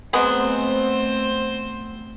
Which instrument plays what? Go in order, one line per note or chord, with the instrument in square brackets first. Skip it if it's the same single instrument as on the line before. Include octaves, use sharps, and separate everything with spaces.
[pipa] F#3 G#3 B3 [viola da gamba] A3 C4 [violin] C5